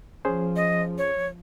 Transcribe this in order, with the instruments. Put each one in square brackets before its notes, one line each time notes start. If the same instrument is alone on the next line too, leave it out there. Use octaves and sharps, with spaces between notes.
[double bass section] F3 [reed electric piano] C#4 G#4 C5
[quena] D#5
C#5